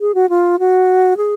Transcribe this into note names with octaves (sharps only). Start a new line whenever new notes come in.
G#4
F#4
F4
F#4
G#4